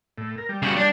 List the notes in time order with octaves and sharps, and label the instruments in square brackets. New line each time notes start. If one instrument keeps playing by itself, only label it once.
[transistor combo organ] A2
A#4
G3
[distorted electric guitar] C#3 F#4
D4